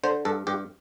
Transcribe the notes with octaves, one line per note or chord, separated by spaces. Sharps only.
D3 C5
G2 A4
G2 G4